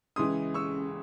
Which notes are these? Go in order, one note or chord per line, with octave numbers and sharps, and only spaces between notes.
C#2 C#3 E3 G#3 C6 D#6
C#6 E6